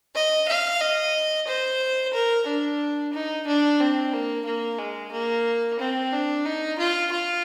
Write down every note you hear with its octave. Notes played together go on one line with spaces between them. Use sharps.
D#5
F5
D#5
C5
A#4
D4
D#4
D4
C4
A#3
A#3
G#3
A#3
C4
D4
D#4
F4
F4